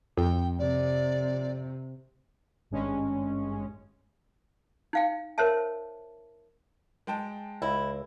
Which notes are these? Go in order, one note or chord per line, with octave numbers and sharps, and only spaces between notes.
F2 G5
C3 D5
G#1 G2 G#3 C#4
D#4 F5 G5
A#4 C5 C#5 E5 A5
G#3 G5 A5
C#2 E4